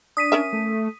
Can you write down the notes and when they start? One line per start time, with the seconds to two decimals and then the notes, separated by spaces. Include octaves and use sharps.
0.17 D4 D#6 B6 D#7
0.32 C#4 A#4 E5
0.53 A3